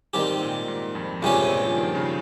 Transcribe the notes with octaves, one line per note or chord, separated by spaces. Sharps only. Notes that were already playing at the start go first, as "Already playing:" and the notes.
G#2 D#3 G3 C4 G4
A#2
G#2
F2
C#2 G2 C3 G3 C#4 G4
A#2
F3
D#3
C#3